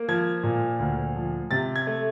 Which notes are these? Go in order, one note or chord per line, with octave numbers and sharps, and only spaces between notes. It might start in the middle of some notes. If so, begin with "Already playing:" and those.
Already playing: A#3
F3 G#6
A#2
D2
F3
C3 A6
G#6
A3